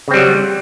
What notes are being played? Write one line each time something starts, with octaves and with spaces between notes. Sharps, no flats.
C#3 F#3 G3 C4